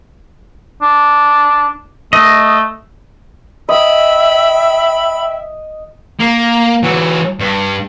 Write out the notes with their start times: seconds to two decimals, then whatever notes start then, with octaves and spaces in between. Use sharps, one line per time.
0.82 D4
2.13 A3 D#5
3.69 D#5 E5 G5 B5 E6
6.20 A#3
6.83 E3 F#3
7.40 G2